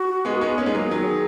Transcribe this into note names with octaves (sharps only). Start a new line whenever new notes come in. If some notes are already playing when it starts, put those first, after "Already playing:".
Already playing: F#4
G#3 B3 G#4
A#4
G#3 B3 G#4
A#3 C#4
G#3 B3
F#3 A#3
D#3 F#3